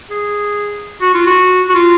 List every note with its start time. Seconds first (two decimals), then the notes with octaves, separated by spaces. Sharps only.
0.10 G#4
1.02 F#4
1.15 F4
1.26 F#4
1.70 F#4
1.75 F4